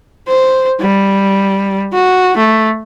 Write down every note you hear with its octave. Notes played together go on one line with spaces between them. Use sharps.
C5
G3
F#4
A3